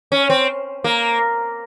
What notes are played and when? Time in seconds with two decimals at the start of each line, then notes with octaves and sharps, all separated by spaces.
0.12 C#4
0.30 C4
0.84 A#3